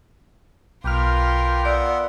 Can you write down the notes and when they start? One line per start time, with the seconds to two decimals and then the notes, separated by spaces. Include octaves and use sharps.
0.84 B1 F4 G4 A#4 B4 G5 F6
1.65 B3 D5 E5 F#5